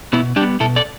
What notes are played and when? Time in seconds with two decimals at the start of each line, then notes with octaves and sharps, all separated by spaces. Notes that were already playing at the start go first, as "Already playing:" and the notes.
0.13 B2 B3 E4
0.36 G3 B3 D4 G4
0.60 B2 E4 A4
0.76 A4 D5